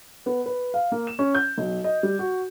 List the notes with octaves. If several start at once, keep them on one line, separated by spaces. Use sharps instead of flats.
B3
B4
F5
A#3
E7
C#4
G6
B1
D#5
G3
F#4